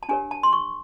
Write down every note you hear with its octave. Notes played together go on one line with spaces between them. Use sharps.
A5
D4 G4 A#4 C#5 G#5
A5
C6
C#6